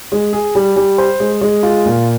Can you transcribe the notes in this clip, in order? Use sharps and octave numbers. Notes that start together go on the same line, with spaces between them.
G#3
G#4
G3
G3
C5
G#3
G#3
F4
A#2